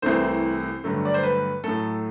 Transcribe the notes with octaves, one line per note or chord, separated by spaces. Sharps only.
C2 C3 E3 A3 C5
G2 D3 F#3 A3
D5
C5
B4
A2 F#3 A3 A4